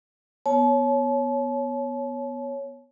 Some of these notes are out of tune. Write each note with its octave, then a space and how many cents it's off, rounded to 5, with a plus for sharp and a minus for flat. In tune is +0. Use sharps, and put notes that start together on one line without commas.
B3 +0 C#5 +0 A5 -40